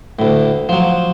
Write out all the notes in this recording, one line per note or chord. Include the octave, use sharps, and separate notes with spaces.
D2 A2
F3 F#3